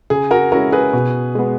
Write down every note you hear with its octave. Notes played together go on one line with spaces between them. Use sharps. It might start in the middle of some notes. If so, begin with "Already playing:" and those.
C#3 G#4
F#4 A#4
G#3 C#4 E4 F#4 A#4
G#4 B4
B2
G#3 B3